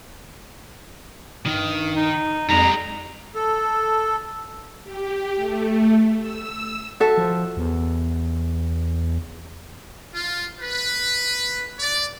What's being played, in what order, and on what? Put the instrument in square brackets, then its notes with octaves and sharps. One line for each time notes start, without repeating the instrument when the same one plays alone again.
[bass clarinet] G2 [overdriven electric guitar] D#3
[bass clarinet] D#4
[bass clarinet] F2 [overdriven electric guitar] G3 G#3 [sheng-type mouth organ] A#5
[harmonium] A4
[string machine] G4
A3
E6
[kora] F#4 A4 E5
[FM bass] F3
E2
[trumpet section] F4
B4
D5